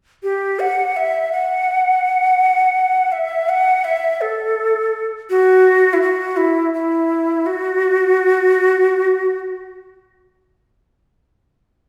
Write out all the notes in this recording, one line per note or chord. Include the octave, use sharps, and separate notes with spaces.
G4
F#5
E5
F#5
E5
F#5
E5
A4
F#4
E4
F#4
E4
E4
F#4